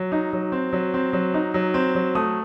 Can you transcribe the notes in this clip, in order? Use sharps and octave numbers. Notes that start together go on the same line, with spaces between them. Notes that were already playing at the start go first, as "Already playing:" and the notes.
Already playing: F#3
D#4
F#3
C4
F#3
C4
F#3
D#4
F#3
C4
F#3
A3 D#6